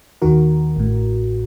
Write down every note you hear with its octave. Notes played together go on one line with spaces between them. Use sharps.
D#2 D#3 F#4 A#4
A1 A2